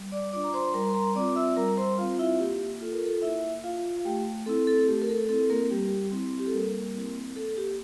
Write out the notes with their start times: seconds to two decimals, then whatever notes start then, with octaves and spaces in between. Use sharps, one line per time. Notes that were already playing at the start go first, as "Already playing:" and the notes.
Already playing: G3
0.12 D5 D6
0.33 D4 F4 D5 D6
0.44 A#5
0.54 C5 C6
0.74 G3 A#4 A#5
0.90 C6
0.95 A#4 A#5
1.15 C4 F4 D5 D6
1.36 E5 E6
1.57 G3 A#4 A#5
1.77 C5 C6
1.98 C4 F4 F5
2.19 E4 E5
2.39 A#3 G4
2.80 F4 A4
2.93 A#4
3.05 A4
3.22 A#3 E4 E5
3.64 F4 F5
4.05 A3 G4 G5
4.46 C4 E4 A4
4.67 A4
4.88 A3 G4
5.02 A#4
5.09 A4
5.29 C4 E4 A4
5.50 A#3 A#4
5.70 G3 G4
5.88 G4
6.11 C4 E4
6.39 G4
6.46 A4
6.53 G3 A#3 A#4
6.95 C4 E4
7.36 A#3 A4
7.57 G4